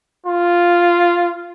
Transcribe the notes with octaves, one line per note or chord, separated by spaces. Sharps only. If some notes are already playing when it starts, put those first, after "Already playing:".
F4